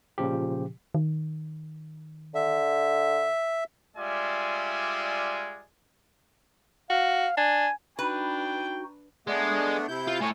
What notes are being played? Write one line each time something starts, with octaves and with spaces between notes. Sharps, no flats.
A#2 C#3 F3 G4
D#3
D3 E5
G3 G#3 F4 D5 E5 G#5
F#4 F5
D4 G#5
D4 D#4 F#4 B4 G5
G#3 A3 B3 D4
C3 E4 G6
F4
A2 C#5 G#5